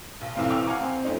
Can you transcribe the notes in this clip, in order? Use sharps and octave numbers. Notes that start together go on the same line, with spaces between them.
B1
B1 E2 A2 C4 F5
G5 C#6 E6 F7
F5 F#5 G#5 A#5 D6
C4 C5
F2 A3 C#4 D#4